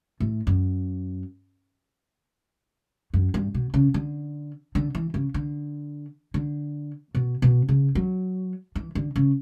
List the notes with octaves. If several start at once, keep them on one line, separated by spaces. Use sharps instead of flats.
A2
F#2
F#2
G2
B2
C#3
D3
D3
E3
C#3
D3
D3
B2
B2
C#3
F#3
E3
D3
C#3